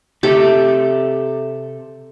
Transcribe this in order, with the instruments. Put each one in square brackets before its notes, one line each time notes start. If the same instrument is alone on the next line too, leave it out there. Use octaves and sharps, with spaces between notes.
[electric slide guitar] C3 A4 E5 [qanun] G4